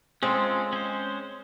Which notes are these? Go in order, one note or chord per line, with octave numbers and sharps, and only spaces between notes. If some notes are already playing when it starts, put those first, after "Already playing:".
G#3 C4 C#4 F4 A4
C#4 C5